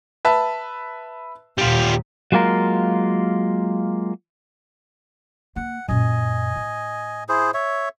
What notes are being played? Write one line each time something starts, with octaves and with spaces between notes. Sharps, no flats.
B4 E5 A5
D#2 A#2 G3 F4
F#3 G#3 A#3 F4 A#4
A#3 F#5
F#2 A#2 D#5 G#5
A2
E4 G#4 C5
C#5 E5